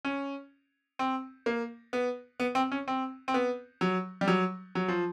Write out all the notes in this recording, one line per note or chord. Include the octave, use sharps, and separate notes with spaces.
C#4
C4
A#3
B3
B3
C4
C#4
C4
C4
B3
F#3
G3
F#3
F#3
F3